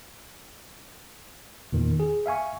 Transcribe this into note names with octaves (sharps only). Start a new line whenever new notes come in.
E2 A#2 D#3
G#4
E5 F5 G#5 C#6